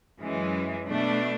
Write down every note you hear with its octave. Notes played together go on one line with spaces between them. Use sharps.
F#2 E3 G#3
B2 A3 D4